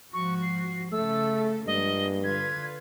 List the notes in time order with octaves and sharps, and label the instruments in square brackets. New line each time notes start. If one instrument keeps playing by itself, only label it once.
[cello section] G#2 F3 F#4 [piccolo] C#6
[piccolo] C7
[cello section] C#3 A4 [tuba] A3 [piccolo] E6
[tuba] G2 [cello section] F3 G#3 A#3 [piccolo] D#5
[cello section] D3 F4 B4 [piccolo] G#6